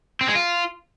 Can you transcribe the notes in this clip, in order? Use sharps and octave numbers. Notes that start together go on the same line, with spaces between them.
C4
G#3
F4